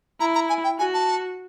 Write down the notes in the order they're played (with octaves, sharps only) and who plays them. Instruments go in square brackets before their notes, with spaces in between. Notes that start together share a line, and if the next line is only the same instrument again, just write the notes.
[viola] E4 [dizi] A#5
[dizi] A#5
G#5
G5
[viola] F#4 [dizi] G#5
[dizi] A5